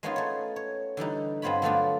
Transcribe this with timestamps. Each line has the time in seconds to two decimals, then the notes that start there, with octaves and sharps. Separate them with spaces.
0.03 G#3 A#3 B3 C#4 D#4 F4
0.16 A3 C#5
0.56 C#5
0.97 D3 E3 G3 D#4
1.42 G2 B3 C4 F4 C#5 B5
1.62 D3 F#3 A3 B3 D4 F4